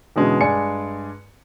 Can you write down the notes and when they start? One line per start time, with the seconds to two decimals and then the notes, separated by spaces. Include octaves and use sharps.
0.16 E2 B2 D3 E3 G#3 C#4
0.40 G2 G#3 D5 G#5 C#7